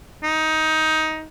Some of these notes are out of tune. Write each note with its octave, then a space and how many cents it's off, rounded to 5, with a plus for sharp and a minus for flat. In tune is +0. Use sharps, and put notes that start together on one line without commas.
D#4 +15